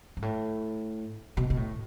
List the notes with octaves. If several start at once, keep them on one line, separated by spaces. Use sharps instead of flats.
G#2
A2
B2
B2
A2